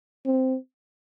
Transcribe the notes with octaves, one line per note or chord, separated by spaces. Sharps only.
C4